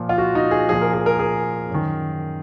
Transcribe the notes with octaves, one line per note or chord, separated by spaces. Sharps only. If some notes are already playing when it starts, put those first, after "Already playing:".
Already playing: A#2 F3
F4
F#4
D#4
G#4
A#2 F3 G#4
A#4
G#4
A#4
G#4
F#2 D#3